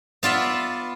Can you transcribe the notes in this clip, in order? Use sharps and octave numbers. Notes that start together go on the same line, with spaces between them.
B3 F4 D5 E5